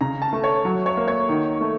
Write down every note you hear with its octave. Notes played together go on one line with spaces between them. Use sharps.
C#3 A#5
A5
A3
C#5
F#3
C#5
A#3
C#5
D#3
A3